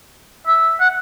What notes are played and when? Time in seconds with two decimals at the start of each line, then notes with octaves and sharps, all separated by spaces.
0.47 E5
0.80 F#5